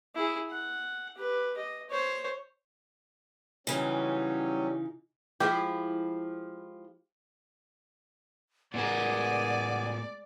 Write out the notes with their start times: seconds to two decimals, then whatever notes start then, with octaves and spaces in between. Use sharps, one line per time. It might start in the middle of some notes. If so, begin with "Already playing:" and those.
0.15 E4 G#4
0.50 F#5
1.16 G4 B4
1.57 D#5
1.90 C5 C#5
3.67 C#3 E3 F#3 G3 C#4 D#4
5.40 F3 G#3 E4 G4
8.74 A2 G#3 B3 A#4 D5 F#5 G#5